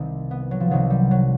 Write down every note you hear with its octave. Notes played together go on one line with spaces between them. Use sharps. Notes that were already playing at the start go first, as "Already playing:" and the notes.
Already playing: C2 C3 D#3 C4
B3
F#3
F3
C2 C3 D#3 F#3
G3
F#3